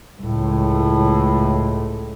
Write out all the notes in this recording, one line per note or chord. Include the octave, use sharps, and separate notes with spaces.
C#2 A2